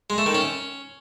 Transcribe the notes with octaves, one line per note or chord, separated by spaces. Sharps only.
G#3
A3
D#3
C#4